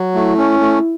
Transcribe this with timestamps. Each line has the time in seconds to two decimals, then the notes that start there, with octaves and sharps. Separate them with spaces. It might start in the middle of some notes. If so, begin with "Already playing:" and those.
Already playing: F#3
0.15 A3 E4
0.38 C#4
0.60 A3